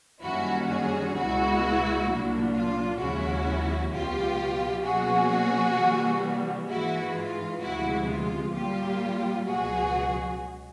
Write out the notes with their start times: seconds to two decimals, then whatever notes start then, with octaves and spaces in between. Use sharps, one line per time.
0.22 F#2 D#3 G3 A#3 C#4 E4 F#4
0.68 F#4 G#4
1.14 C#2 B2 G#3 B3 E4 F#4
2.07 C2 A#2 F#3 A#3 D4
2.53 F4
2.99 D#2 C#3 F3 G#3 C#4 E4 F#4
3.91 C#2 B2 F#3 F4 G4
4.84 B2 F#3 A#3 C#4 F#4 G#4
5.77 C3 E3 G3 A#3
6.69 G#2 E3 G#3 E4 F#4
7.15 F4
7.61 D2 C3 F3 G#3 E4 F#4
8.08 F4
8.54 A#2 G3 A#3 F4 G4
9.46 C#2 B2 F#3 F#4 G#4